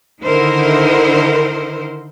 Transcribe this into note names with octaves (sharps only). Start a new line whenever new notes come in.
D3 D#3 D#4 E4 A#4 C5